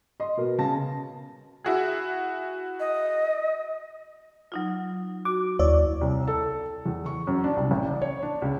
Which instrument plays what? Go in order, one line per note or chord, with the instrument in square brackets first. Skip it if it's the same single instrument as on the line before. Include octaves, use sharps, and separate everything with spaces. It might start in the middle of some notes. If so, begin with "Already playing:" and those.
[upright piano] D#5 C6
B2 B3 A#4
C#3 A5 A#6
[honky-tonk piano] E4 F#4 G#4
[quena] D#5
[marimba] F#3 D#4 F4
[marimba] F#4 [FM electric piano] D6
[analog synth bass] D#2 [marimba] E4 [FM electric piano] C#5 D5
[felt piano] C2
A4
E2
C#6
F#2
D4
C2
A1
D5
C#5
D4
C#2